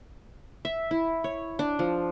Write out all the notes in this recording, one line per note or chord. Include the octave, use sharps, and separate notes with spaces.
E5
E4
C#5
D4
F3